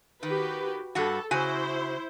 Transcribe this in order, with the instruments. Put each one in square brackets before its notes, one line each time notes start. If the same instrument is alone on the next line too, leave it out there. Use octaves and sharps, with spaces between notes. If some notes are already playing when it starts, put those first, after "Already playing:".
[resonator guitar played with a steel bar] D#3 [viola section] F#4 G4 B4
[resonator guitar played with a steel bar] G2 G3 F#4 [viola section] A4
[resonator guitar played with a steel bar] C#3 F#4 G#5 [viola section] E4 C5